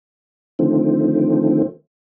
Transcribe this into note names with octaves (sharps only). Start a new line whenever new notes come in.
D3 D#3 F3 A3 C4